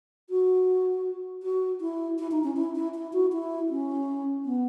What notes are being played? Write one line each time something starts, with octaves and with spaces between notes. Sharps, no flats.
F#4
F#4
E4
E4
D#4
C#4
E4
E4
E4
F#4
E4
C#4
B3